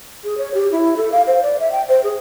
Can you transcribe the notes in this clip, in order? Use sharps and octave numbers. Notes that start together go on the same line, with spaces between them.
G#4
C#5
G4
E4
A4
F5
C5
D5
E5
G5
C5
G#4